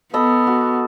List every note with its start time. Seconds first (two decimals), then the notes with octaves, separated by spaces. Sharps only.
0.14 B3 A4 D#5 B5
0.47 F#4